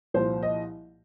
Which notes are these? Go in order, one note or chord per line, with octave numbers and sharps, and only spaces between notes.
C2 A#2 F3 C5
D#5